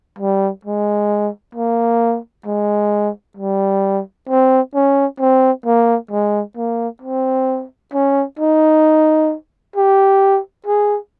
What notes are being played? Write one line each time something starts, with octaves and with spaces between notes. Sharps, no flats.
G3
G#3
A#3
G#3
G3
C4
C#4
C4
A#3
G#3
A#3
C4
C#4
D#4
G4
G#4